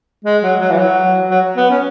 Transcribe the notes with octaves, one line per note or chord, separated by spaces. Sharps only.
G#3
F#3
F#3
E3
F#3
F#3
B3
C#4